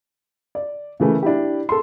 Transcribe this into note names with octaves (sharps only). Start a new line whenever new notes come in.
D5
C#3 E3 A3 A#3
D4 E4 G4
A4 C6